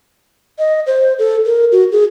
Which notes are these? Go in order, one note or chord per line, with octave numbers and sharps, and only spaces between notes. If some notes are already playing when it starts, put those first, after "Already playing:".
D#5
C5
A4
A#4
F#4
G#4